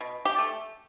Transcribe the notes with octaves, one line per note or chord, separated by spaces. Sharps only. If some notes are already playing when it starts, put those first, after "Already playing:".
B2
G4
A3